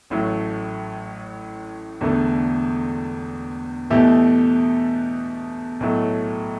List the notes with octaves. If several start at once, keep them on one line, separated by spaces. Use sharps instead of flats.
A1 A2 F#3 A3
E1 E2 D3 A3
E2 B2 A3 E4 G4
B1 A2 F#3 A3